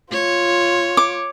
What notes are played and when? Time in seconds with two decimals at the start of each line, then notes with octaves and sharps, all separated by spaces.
0.12 F4 C#5
0.97 D6